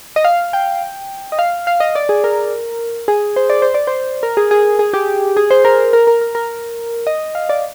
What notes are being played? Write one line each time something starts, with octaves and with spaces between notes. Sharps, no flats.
D#5
F5
G5
D#5
F5
F5
D#5
D5
G#4
A#4
G#4
C5
D5
C5
D5
C5
A#4
G#4
G#4
G#4
G4
G#4
C5
A#4
A#4
A#4
A#4
A#4
A#4
D#5
F5
D5